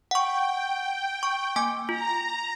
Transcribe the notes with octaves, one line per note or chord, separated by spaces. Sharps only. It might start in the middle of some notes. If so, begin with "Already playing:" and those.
F#5 G5 C#6
C#6
A#3 G#5 D6
F4 A#5